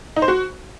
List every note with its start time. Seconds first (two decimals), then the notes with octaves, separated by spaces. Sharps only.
0.16 D#4
0.22 C5
0.28 F#4